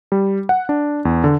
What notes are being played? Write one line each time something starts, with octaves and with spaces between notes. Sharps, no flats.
G3
F#5
D4
E2
D3